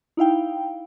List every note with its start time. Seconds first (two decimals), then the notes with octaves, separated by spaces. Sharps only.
0.17 D#4 E4 F5 G5